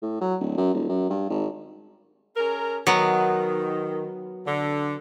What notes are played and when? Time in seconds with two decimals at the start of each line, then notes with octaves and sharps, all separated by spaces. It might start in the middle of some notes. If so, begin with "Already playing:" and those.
0.02 A2
0.21 F#3
0.40 D1
0.57 F#2
0.74 D#1
0.89 F#2
1.10 G2
1.29 G#1
2.37 C#4 G#4 A#4
2.87 D#3 F#3 B3
4.45 D3